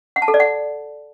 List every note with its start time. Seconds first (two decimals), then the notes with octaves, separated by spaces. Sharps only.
0.16 F#5
0.22 A5
0.28 A4
0.34 D5
0.40 F#5